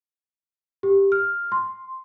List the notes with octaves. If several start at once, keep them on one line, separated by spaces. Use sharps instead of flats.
G4
F6
C6